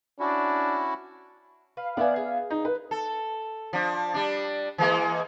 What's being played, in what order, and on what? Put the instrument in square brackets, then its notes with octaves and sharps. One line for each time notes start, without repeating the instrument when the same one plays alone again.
[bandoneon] C#4 E4 F#4 [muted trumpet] D4
[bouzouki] B4 [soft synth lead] F5
[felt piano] B3 E5 G#5 [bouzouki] D5 F#5
[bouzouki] G#4
[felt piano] D#4
B4
[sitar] A4
F3 D4
G3 D4
E3 G#3 A#3